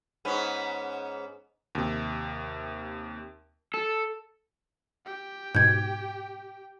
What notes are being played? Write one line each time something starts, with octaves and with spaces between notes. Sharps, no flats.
G#2 B3 C#4
D#2 C3
A4
G4 G5
G#2 B2 G6 G#6